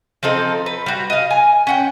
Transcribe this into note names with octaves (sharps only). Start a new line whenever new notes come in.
F3 C4 D#4 A4
B4
G3 F#4
D#5 F5
G#5
C#4 F#5 G5